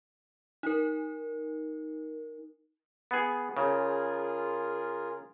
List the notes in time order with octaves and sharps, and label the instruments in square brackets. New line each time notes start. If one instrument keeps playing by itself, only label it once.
[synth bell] D#4 A#4
[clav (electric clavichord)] B3 G#4
[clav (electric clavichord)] C#3 [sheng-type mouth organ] F4 G#4 A#4